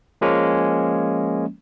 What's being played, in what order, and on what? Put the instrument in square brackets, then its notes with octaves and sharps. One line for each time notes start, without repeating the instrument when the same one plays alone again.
[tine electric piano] F3 G#3 A#3 C#4